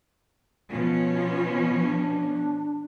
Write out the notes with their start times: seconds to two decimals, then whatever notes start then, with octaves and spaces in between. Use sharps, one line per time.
0.71 B2 F3 C#4 F4
1.78 D4